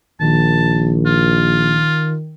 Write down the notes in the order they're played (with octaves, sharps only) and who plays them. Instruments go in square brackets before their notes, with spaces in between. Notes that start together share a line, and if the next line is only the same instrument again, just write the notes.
[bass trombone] A#1 [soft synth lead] D#3 [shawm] A5
[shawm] F4